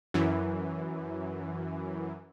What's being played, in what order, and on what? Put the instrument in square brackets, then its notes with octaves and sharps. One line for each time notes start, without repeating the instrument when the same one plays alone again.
[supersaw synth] F#2 E3